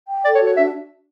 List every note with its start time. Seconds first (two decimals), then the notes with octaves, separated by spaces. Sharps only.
0.08 G5
0.25 A4 D5
0.35 C#5
0.41 F#4
0.46 C#5
0.57 D4 E5